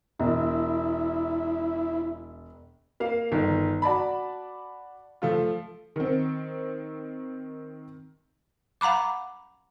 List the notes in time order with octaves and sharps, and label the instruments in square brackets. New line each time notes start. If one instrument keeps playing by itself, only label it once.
[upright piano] E1 [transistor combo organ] E4
[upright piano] A#3 F5
G1 D#3
F#4 D5 A5 B5
F3 A3 F4
[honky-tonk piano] D#3 C4
[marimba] F5 F#5 A#5 B5 D6